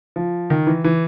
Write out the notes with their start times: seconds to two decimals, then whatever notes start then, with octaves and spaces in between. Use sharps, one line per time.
0.16 F3
0.50 D#3
0.67 E3
0.84 E3